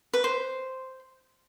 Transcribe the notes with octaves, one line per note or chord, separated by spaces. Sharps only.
B4
C5